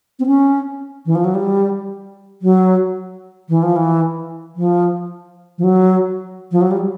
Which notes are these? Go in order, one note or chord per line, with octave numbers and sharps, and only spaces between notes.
C4
C#4
E3
F3
F#3
G3
F#3
E3
F3
E3
F3
F3
F#3
F3
F#3
G3